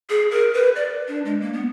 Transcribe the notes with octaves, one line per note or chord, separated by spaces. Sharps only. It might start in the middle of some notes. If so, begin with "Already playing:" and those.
G#4
A#4
B4
D5
D4
G#3
A#3
B3